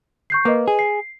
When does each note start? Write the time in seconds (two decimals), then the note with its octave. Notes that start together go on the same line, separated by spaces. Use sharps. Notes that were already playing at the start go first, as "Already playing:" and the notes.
0.30 C#6 G6 C7
0.45 A#3 B4 D#5
0.68 G#4
0.79 C7